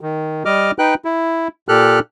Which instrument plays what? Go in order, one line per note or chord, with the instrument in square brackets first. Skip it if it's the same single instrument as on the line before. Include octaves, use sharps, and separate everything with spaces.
[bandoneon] D#3
G3 D#5 D6 F6
D#4 B4 G5 F#6
E4
A#2 G4 A4 F6 F#6